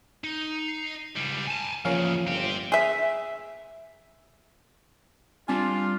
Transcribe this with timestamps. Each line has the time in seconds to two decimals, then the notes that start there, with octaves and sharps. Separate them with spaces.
0.24 D#4
0.68 C7
1.16 C#2 G3
1.47 G#5 A5
1.85 E2 C#3 F3 A#3 C#4 F5
2.27 G1 C4 G4
2.72 G#4 E5
5.48 G3 C4 D4 F4 G#5